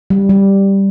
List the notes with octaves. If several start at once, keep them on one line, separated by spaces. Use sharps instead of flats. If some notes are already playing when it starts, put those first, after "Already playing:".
G3
G3